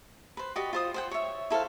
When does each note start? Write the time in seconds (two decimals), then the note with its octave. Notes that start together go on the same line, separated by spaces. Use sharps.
0.37 B4 C5
0.56 F#4 G4 D5 D#5
0.73 F4 C5 D#6
0.94 C5 F#5 G5
1.11 C#5 E5
1.50 E4 A4 C5 F5